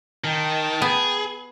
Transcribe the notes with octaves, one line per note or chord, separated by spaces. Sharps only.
D#3 G5 A5
B3 G#4